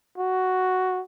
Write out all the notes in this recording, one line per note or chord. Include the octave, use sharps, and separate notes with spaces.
F#4